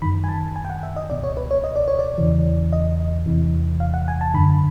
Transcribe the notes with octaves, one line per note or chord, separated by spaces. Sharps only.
F#2 D#3 B5
G#5
A5
G#5
G5
F#5
E5
D#5
C#2 B2 D5
C#5
B4
C#5
D#5
D5
C#5
D5
E2 C#3 E3
D#5
E2 C3 E3
F5
F#5
G#5
A5
F#2 D3 B5